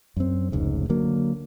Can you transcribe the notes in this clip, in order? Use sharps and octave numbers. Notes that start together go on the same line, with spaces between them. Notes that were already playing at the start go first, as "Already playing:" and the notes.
F#2 C4
F1 C#2 G#2
D3 F#3 A#3